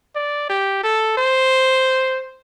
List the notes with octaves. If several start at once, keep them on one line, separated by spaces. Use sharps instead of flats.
D5
G4
A4
C5